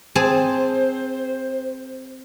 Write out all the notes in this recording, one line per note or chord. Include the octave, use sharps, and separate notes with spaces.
C4 G#4 C5 A5